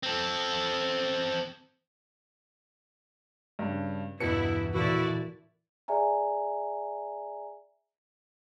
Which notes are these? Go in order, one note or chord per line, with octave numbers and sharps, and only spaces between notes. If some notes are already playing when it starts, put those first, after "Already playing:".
C4 A4
G2 C#3
E2 G2 B2 B3 E4 C#7
A#2 E3 A3 E4 F#4 D5
G#4 D5 E5 G#5 A#5